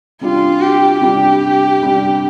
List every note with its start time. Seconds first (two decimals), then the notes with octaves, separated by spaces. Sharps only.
0.21 C3 G3 D4 F4
0.61 G4
1.01 C3 G3 D4 G4
1.82 C3 G3 D4